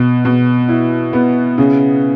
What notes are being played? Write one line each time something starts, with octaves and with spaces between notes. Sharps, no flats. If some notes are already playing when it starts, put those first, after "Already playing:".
Already playing: B2
B2
E4
B3
C#3